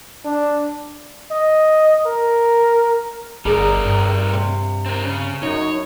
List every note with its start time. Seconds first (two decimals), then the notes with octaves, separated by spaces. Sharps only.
0.25 D4
1.31 D#5
2.07 A#4
3.45 G1 G3 G#4 A#4 D5 A#5
3.85 G2
4.33 C3
4.86 C4 A#4
5.03 C#3
5.43 F#2 D#4 C#5